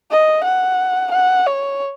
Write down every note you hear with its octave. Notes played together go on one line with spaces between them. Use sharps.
D#5
F#5
F#5
C#5